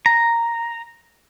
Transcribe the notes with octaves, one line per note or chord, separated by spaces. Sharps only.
A#5